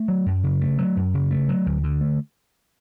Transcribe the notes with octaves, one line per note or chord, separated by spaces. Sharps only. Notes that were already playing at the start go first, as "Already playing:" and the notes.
Already playing: A3
F#3
F#2
C#3
A3
F#3
F#2
C#3
A3
F#3
D2
D3
A3